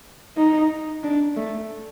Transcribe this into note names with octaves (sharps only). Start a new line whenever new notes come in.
D#4
D4
A3